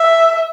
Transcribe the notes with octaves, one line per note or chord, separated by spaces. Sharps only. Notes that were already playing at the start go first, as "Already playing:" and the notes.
Already playing: E5